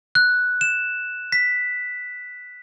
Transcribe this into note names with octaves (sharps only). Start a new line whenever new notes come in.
F#6
E7
B6